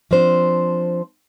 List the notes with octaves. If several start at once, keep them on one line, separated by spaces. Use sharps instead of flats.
F3 C4 D4 C5